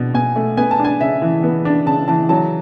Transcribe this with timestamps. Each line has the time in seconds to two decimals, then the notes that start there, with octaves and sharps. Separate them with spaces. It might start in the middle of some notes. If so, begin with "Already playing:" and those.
Already playing: B2 D4
0.14 B2 G#5
0.36 A3
0.57 B3 G#5
0.71 A5
0.79 D4
0.85 G#5
1.01 C#3 E5
1.22 E3
1.43 B3
1.65 D4
1.86 C#3 A5
2.08 E3 A5
2.29 F#3 A5